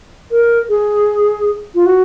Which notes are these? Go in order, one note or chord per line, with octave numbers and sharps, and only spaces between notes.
A#4
G#4
F4
F#4